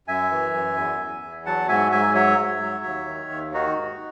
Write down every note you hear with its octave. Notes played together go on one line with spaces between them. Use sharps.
F#2 E5 G#5
E3
F#2
E2
E2
E2
F#3 F#5 A5
G#2 E5 G#5
G#2 E5 G#5
F#3 C#5 E5
G#2
F#3
D#2
D#3
D#2
D#3 D#4 F#4
G#2